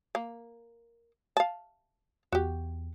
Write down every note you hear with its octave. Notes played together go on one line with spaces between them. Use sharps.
A#3
F5 A5
E2 F#4 G4